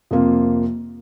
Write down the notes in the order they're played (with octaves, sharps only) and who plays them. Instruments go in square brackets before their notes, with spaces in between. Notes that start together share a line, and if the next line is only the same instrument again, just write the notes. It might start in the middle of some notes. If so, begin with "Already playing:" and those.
[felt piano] F2 C3 A#3 F4